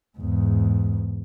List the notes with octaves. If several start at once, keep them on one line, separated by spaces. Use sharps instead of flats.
E2 G#2